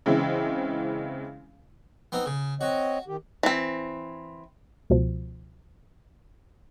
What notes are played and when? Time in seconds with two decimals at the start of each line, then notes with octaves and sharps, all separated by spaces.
0.06 C#3 E3 G#3 C4 E4
2.12 B3 C4 D#4
2.26 C#3
2.61 C4 F#4 C#5 D#5
3.08 D#3 G4
3.43 E3 C4
4.90 C#2 B2 F3